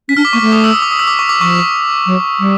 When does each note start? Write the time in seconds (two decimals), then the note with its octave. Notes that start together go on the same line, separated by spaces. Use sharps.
0.08 C#4 B6
0.17 D4 F6
0.25 D6
0.33 A#3 C#6
0.41 A3 D6
0.52 D#6
0.64 E6
0.74 D#6
0.82 D6
0.91 D#6
0.99 E6
1.07 D6
1.19 C#6
1.29 D6
1.40 F3 C#6
2.06 F#3
2.40 G3